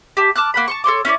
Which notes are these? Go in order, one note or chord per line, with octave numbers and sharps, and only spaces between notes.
G4 A5
A5 D6 F6 F#6
A#3 F#5 B5
A5 C6 C#6
A4 C#5 C6 D6
C#4 E4 C5 D5